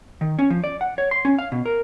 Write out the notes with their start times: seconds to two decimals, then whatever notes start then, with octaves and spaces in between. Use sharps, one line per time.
0.21 D#3
0.39 C#4
0.50 F3
0.64 D5
0.81 F#5
0.98 C#5
1.11 C6
1.25 C#4
1.39 F5
1.52 B2
1.66 A#4